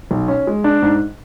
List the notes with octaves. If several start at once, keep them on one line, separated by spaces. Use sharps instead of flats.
B1
C#4
G#3
D4
G#2